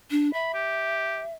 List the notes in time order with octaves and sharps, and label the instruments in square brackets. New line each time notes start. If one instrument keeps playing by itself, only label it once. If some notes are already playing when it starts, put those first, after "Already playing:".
[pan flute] D4
[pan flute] E5 [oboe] B5
[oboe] G4